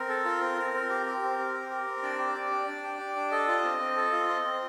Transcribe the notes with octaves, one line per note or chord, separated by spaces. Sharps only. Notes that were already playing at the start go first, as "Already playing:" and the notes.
Already playing: C4 A#4
A4
F4
C4
C4
C4
G4
G4
C4
C4
G4
G4
C4
D4 D5
G4
G4
D4
D4
G4
G4
D4
A4 D#5
F4
C4
C4
A4
F4
C4
C4